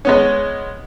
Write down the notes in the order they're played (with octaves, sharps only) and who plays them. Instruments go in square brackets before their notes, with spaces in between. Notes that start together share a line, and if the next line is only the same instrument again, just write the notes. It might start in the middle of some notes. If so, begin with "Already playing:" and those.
[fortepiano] G#3 B3 C#4